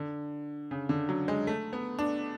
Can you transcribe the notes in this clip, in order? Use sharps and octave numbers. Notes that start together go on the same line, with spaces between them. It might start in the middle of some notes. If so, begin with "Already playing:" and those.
Already playing: D3
C#3
D3
F#3
G#3
A3
B3
D4